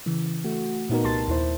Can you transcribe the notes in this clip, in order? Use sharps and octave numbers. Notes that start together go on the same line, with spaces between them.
C#3 E3
A3 F#4
A#2 B3 D#4 F#4 A#4
C2 G3 A5 C6 A6
D#2 E4 C5